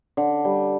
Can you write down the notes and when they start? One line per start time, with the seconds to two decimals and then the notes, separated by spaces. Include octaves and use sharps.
0.17 D3
0.45 G3